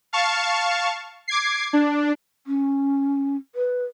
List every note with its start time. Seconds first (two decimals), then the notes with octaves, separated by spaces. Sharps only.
0.13 F5 A5 C#6
1.28 D6 G#6 C7
1.73 D4
2.47 C#4
3.55 B4